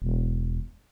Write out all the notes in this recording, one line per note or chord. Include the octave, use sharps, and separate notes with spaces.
E1